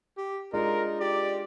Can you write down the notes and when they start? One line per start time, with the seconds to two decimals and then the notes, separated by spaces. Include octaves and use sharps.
0.18 G4
0.53 G#3 D4 D#4 F4 A#4
1.00 G4 D5